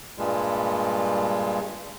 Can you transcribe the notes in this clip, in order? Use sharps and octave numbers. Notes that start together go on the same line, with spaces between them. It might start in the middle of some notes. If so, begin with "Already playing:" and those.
G2 A#2 G3 G#3